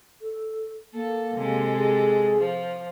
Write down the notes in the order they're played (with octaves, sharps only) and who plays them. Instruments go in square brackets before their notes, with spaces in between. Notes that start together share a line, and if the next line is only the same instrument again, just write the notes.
[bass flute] A4
[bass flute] A#3 [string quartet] A4
[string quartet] C3 G#3 A4
[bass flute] G#4
[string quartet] F3